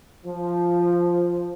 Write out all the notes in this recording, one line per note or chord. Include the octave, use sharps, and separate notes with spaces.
F3